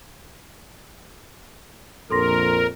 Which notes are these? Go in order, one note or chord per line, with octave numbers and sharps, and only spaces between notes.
A#1 F2 A4 A#4 C6 A#6